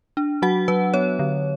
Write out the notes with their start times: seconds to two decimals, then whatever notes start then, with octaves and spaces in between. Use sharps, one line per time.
0.17 D4
0.42 F#3 F#4 F#5
0.68 F#3 B4
0.94 B3 C#5
1.19 D3